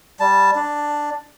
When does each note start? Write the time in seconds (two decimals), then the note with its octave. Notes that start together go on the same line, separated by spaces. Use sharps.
0.20 G3 A5
0.56 D4